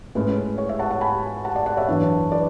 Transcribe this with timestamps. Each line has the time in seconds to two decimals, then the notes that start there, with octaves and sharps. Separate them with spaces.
0.15 A2 G#3 C#4 B4
0.58 C#5
0.69 C#5 E5
0.79 F#5 A5
0.91 F#5 A5
1.01 G#5 B5
1.45 F#5 A5
1.56 D5 F#5
1.66 D5 F#5
1.77 C#5 E5
1.88 F#2 E3 B3 D4
2.31 B4 D5